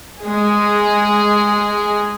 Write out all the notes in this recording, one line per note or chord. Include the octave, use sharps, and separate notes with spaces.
G#3 G#4